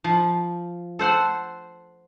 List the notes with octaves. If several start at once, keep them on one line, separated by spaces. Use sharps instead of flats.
F3
A4 C5 F#5 C6